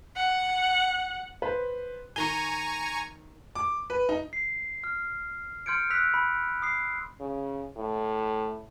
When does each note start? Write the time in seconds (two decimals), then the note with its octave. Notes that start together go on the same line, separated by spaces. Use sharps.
0.17 F#5
1.42 B4 C5
2.16 D#3 G#5 A#5 C#6 G7
3.55 D6
3.90 B4
4.09 D#4
4.33 C7
4.84 F6
5.66 C6 F6 G6 G#6 C#7 D7
5.90 E6 F#6 B6 F7
6.14 B5
6.62 D#6 C7
7.20 C#3
7.77 A2